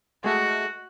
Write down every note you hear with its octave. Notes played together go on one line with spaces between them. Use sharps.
G#3 A3 F#4